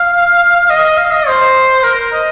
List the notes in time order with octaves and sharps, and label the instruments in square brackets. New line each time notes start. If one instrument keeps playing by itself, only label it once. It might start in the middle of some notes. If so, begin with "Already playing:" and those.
Already playing: [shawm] F5
D#5
F5
D#5
C5
A#4
D#5